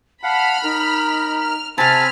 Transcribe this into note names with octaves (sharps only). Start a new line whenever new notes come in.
F5 F#5 A5 B5 F6
D#4 A#4
F6
C3 C4 G#5 A5 B5 F6